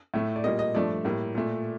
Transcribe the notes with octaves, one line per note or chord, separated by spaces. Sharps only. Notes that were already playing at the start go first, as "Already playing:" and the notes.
A2 A3
D5
A#2 G3 A#3 D#5
D#5
G2 F3 A3 D5
A2 G3 A#3
A#2 A3